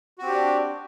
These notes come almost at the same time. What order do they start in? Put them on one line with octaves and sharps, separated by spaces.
F#4 C4 G4 D4